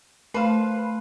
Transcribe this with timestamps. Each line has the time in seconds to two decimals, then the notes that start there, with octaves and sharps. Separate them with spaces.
0.34 A3 B4 C5 F5